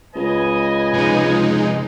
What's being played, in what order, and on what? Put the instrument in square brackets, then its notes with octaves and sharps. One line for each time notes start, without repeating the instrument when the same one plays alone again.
[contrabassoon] C#2 [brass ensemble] B4 D#5 G#5
[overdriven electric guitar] C3 F3 [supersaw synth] G#3 D#4